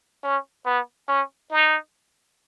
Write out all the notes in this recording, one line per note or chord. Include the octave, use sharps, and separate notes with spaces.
C#4
B3
C#4
D#4